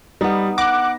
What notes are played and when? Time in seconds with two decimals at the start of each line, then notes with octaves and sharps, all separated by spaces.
0.21 G3 B3 D#4
0.58 F#5 D6 F#6 A#6